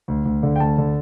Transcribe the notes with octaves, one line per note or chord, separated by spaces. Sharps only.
D2
D2
D3
G5
D2 A5
D3